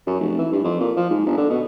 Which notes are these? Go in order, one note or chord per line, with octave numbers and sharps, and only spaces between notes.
F#2
F1
E3
G2
F2
A#2
F3
G#2
G1
D3
B2